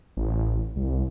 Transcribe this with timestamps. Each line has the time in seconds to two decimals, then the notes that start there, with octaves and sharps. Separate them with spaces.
0.17 A1
0.76 C2